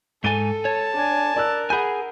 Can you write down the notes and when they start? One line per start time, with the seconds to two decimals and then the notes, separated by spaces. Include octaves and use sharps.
0.24 G#2 A4 G#5 A6 D#7 G7
0.65 C#5 A5
0.95 D4 G#5
1.36 A#4 D5 E6 F#6
1.70 G#4 F#5 G#5 B5 G6